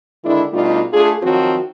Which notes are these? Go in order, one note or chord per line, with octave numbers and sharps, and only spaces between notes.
D3 D#3 G#3 D4 E4
B2 G3 A3 D4 D#4 F4
A3 D4 F4 G#4
D#3 F3 F#3 C4 F#4